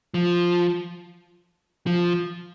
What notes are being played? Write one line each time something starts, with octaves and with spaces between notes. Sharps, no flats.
F3
F3